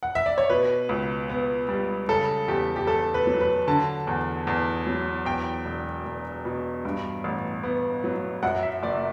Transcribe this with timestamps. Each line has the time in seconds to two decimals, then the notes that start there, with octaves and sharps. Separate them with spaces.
0.03 F#5
0.15 E5
0.26 D5
0.38 C#5
0.50 B2 B4
0.89 C#2
1.30 B3
1.69 G3
2.08 C#3 A4
2.48 E2 G4
2.76 G4
2.87 E2 A4
3.14 B4
3.27 F#3
3.41 B4
3.68 D3 A5
4.07 E2
4.47 E2
4.87 F#3
5.25 E2 G5
5.65 E1
6.05 E1
6.45 B2
6.85 G2
7.24 A1
7.63 B3
8.04 F#3
8.43 F#2 F#5
8.63 E5
8.82 F#1 D5